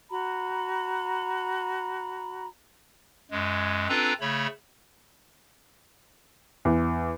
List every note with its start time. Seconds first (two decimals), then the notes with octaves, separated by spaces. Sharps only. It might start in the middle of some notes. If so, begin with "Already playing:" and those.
0.11 F#4 A#5 B5
3.31 F#2 G#3
3.89 C4 D4 F4 A4 B4 A#5
4.21 C#3 A3 C#5 B5
6.65 E2